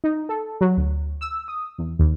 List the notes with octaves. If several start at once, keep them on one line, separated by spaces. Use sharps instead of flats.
D#4
A4
F#3
D2
E6
D#6
E2
D#2